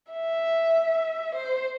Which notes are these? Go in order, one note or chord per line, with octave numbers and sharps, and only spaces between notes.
E5
C5